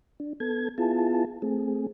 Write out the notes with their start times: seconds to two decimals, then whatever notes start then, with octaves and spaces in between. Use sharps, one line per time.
0.20 D4
0.40 B3 A4 G#6
0.78 B3 E4 F4 G#4 A5
1.42 A3 C4 G#4